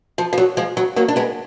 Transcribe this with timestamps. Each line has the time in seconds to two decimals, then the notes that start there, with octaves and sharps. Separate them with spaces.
0.18 F3
0.33 F3
0.38 F#3
0.57 F3 G#3
0.77 F#3
0.96 F#3 A#3
1.08 D4
1.16 G#3 B3